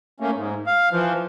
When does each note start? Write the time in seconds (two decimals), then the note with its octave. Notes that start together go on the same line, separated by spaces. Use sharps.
0.20 A3 A#3 C#4
0.35 G#2
0.67 F5
0.91 E3 F3